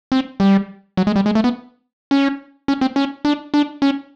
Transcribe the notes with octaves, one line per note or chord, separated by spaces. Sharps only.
C4
G3
F#3
G#3
G3
G#3
A3
B3
C#4
C#4
C4
C#4
D4
D4
C#4